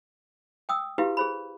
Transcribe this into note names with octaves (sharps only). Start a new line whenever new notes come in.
G5 D#6 E6
E4 F#4 G4 B4 F5
G#4 C5 B5